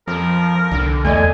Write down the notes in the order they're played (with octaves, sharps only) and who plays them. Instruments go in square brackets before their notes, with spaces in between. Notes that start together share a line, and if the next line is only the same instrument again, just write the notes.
[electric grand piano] F2 [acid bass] F3 [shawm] A#4
[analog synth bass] C2 [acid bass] D3
[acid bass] E2 [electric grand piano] A3 D5 D#5 [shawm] G#5